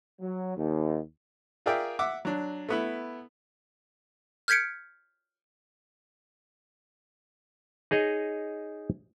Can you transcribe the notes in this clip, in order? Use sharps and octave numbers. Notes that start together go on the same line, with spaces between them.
F#3
D#2
F4 G#4 A#4 D5 E5 G5
E5 F#5 D6
F#3 D4
A3 B3 E4
F6 G6 G#6 B6 C#7 D7
D#4 G#4 C#5 D#5